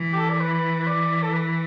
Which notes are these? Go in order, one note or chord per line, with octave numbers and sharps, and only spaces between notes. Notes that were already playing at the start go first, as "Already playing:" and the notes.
Already playing: E3
G4
A4
D5
B4
B4
D5
A4
B4
B4